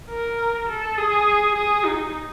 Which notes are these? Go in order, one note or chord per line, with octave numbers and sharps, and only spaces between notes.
A#4
A4
G#4
G#4
D#4